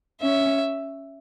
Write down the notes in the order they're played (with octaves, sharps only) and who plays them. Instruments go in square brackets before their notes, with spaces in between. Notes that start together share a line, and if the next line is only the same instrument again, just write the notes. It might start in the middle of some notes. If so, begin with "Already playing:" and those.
[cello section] C#4 [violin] E5